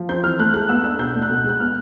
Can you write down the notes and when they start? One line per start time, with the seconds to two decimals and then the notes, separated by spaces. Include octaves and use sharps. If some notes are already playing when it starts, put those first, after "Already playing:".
Already playing: F3
0.09 C4 G6
0.24 E3 F6
0.39 A3 F#6
0.54 G#3 F#6
0.69 B3 E6
0.84 D4 E6
0.99 B2 G6
1.15 A3
1.22 F#6
1.29 B2
1.44 G#3 F#6
1.60 B3 F6